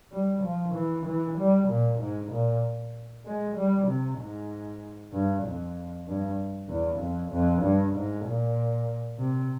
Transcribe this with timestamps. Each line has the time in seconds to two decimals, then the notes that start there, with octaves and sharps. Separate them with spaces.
0.12 G3
0.43 F3
0.74 E3
1.06 E3
1.38 G3
1.69 A#2
1.99 G#2
2.32 A#2
3.25 G#3
3.56 G3
3.88 C3
4.19 G#2
5.13 G2
5.43 F2
6.07 G2
6.69 E2
7.00 F2
7.32 F2
7.63 G2
7.95 G#2
8.25 A#2
9.19 C3